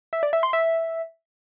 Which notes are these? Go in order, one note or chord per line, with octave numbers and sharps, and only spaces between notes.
E5
D5
E5
C6
E5